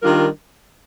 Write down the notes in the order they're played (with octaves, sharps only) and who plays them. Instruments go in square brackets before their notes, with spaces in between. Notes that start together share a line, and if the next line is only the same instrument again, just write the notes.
[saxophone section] D#3 G3 D4 F4 A#4